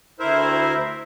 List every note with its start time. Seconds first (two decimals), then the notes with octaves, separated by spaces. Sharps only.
0.19 D2 E4 A#4 C5 E5